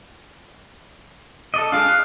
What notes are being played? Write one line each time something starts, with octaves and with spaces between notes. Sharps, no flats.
A4 D5 D#5
G#3 D4 F5
F#6